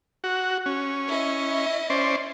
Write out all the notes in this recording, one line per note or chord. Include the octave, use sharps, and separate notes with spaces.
F#4
C#4
E4 D#5
C#4 C5 D5